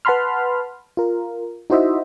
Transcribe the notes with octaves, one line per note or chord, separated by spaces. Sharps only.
B4 F#5 A5 B5 C6 F6
F4 A#4
D#4 E4 F#4 C5 D#5 E5